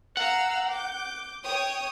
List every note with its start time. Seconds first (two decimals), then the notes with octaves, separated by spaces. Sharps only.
0.17 F5 F#5 A#5 E6
0.71 D6 G6
1.45 C#5 G5 D#6